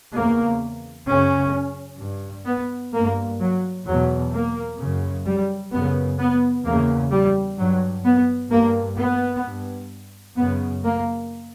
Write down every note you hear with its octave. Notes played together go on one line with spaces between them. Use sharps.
E2 C#3 A#3
F#2 C#3 C#4
G2
B3
G2 A#3
F#3
E2 B2 F#3
A#3
F#2 C#3
G3
F#2 C#3 B3
B3
E2 C#3 A#3
G3
G2 F#3
B3
G2 A#3
B3
G2
F#2 C#3 B3
A#3